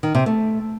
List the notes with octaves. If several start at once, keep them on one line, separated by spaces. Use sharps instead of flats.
D#3
C3
A3